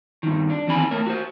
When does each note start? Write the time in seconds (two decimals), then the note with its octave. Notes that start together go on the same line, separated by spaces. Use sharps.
0.23 G2 D#3
0.50 D4
0.67 E2 D#3 E3 C4 G#5 B5
0.91 A3 A#4 C#5
1.07 F#4 C5